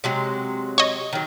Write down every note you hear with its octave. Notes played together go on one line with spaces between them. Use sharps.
C3 F#3 G#3
C#5 D#5
D#3 F#3